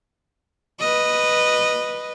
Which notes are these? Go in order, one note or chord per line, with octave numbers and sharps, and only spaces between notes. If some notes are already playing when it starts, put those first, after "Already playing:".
B4 D#5